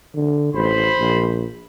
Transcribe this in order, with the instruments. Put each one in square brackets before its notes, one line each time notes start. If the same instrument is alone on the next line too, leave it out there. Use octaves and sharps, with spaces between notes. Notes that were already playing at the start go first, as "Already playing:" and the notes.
[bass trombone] D3
[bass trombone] A1 [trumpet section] C5 B5
[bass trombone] A#1